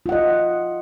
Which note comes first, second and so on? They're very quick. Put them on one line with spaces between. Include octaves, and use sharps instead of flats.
F4 F#5 D#5